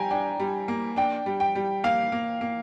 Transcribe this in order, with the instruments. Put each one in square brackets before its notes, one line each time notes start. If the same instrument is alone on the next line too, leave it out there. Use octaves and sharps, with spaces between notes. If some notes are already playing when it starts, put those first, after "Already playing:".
Already playing: [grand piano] G3 [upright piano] G5 G#5 A#5
[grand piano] D4 [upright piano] G5
[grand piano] G3
A#3
[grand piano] D4 [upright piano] G5
[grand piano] G3
[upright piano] G5
[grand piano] G3
[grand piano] A#3 [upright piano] F5
[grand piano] A#3
A#3